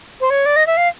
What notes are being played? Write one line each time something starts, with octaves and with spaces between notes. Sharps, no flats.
C5
C#5
D5
D#5
E5
F5